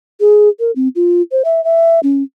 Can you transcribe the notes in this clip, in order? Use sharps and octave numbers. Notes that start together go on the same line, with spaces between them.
G#4
A#4
C4
F4
C5
E5
E5
C#4